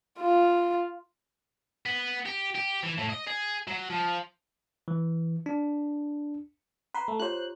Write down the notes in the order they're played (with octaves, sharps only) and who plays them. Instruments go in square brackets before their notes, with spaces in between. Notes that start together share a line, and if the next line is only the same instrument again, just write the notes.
[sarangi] F4
[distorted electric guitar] B3
G4
G4
E3
A2
D#5
G#4
F#3
F3
[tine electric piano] E3
D4
[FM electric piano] B4 C6 [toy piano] A#5
[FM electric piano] A3
[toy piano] F4 G4 C#5 [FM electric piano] C5 F#6